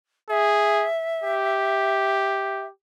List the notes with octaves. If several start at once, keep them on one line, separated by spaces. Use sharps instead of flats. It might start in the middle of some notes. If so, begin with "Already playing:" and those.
G#4 E5
G4